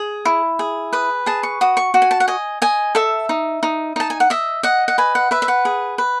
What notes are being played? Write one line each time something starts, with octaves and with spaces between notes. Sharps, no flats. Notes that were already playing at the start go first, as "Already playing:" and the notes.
Already playing: G#4
E4
G#4
B4 D#6
G#4 A5
C#6
F#4 D#6
C#6
F#4
G#5
A5
F#5
D#5 G#5
D#5 G#5
A4 E5
D#4
D#4
D#4 A5
G#5
F#5
D#5 E5
D#5 F#5
F#5
B4 G#5
F#5
B4 E5
E5
F#5
G#4
B4